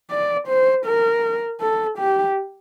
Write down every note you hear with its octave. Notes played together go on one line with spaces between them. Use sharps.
D5
C5
A#4
A4
G4